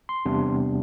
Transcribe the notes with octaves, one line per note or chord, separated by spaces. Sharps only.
C6
E2 C3 G3 B3 D4